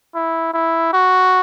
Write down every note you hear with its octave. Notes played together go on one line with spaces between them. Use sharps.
E4
E4
F#4